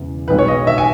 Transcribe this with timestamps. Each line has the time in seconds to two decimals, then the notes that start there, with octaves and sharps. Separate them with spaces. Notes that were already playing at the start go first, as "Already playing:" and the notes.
Already playing: E1 E2 C#3 E3
0.28 B1 B2 G#3 B4
0.39 C#5
0.48 D#5
0.67 E5
0.78 G#5